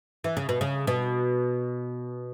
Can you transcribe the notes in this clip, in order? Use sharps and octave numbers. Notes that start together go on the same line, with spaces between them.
E3
C#3
B2
C#3
B2